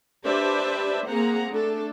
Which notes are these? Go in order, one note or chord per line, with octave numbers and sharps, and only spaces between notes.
D4 G4 B4 C5 D5 E5
A#3 C4 G#4 F#5 A#5
A3 D4 A4